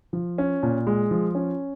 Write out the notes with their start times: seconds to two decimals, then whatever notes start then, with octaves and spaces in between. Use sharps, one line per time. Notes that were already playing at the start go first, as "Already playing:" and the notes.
0.13 F3
0.38 C#4
0.63 A#2
0.87 G#3
1.11 F3
1.35 C#4